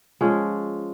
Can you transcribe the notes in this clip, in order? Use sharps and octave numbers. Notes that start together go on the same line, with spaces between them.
F3 G#3 C#4